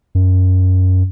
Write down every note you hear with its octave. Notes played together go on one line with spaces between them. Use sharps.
F#2